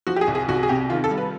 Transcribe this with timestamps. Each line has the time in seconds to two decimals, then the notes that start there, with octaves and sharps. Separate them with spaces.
0.07 F3 F#4
0.16 G4
0.21 G#4
0.28 C2
0.35 G#4
0.48 C2 F#4
0.63 G#4
0.69 C3 G4
0.90 D#3 F4
1.04 A4
1.11 G3
1.18 B4